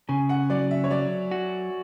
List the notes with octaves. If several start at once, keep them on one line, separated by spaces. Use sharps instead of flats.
C#3 G#5
F#5
F#3 D5
E5
C#5
F#3 D5
F#4